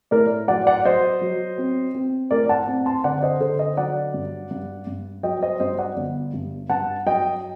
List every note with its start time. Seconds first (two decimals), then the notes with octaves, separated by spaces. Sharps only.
0.11 A2 A#4 D5
0.48 F#3 D5 F#5
0.67 D5 F#5
0.85 F#3 C5 D#5
1.21 F#3
1.58 C4
1.95 C4
2.31 A2 A#4 D5
2.49 F#5 A5
2.67 C4
2.86 A5 C6
3.04 D3 D5 F#5
3.23 C5 D#5
3.40 D3 A4 C5
3.59 C5 D#5
3.77 F#3 D5 F#5
4.14 G2
4.51 G2
4.87 G2
5.23 F#3 D#5 G5
5.42 C5 D#5
5.60 G2 C5 D#5
5.78 D5 F#5
5.97 G1
6.34 G2
6.70 G2 F#5 A5
7.06 F#3 D#5 G5